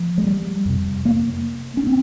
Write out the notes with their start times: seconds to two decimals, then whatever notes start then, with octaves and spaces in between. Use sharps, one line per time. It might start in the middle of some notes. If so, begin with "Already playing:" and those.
Already playing: F3
0.18 G#3
0.24 G3
0.65 F2 C3
1.05 A#3
1.77 C#4
1.87 C4